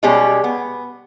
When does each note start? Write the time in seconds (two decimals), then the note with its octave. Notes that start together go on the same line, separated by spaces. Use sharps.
0.03 B2 G3 G#3 C#4 G4 G#4
0.44 B3